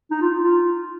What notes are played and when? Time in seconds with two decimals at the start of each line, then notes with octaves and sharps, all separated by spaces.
0.11 D#4
0.21 F4
0.32 D#4
0.42 F4